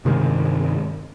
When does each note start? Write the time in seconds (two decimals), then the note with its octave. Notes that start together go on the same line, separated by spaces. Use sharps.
0.05 G2 C3 D#3 G#3